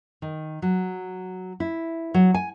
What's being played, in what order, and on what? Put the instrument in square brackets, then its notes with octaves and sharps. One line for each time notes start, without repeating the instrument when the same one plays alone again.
[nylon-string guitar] D#3
F#3
E4
F#3
G#5